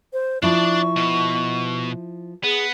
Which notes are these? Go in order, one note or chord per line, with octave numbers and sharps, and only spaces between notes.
C5
F3 D4 E4 D5 C#6
B2
B3 G#4